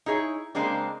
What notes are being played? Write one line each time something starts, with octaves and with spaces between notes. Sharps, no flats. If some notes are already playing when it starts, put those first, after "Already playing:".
D#4 E4 G#4 C#5
C#3 G#3 A#3 C4 D4